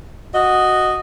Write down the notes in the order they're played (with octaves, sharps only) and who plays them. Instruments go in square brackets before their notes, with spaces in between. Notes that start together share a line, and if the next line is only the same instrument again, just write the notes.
[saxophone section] F#4 D#5